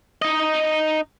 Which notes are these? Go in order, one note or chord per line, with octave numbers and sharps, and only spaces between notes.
D#4 D#5